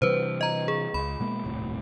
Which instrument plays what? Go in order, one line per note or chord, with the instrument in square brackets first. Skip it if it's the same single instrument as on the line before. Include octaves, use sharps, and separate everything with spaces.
[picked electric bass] C3 E3 G3 [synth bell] B4 C5
[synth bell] D#5 A#5
G#4
[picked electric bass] C#2 [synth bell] B5
[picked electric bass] B2 G#3 A#3
D#1 C2 A2